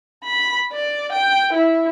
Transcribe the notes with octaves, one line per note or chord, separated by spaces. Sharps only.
B5
D5
G5
E4